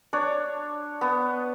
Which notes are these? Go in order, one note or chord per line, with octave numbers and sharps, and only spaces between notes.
D4 C#5
B3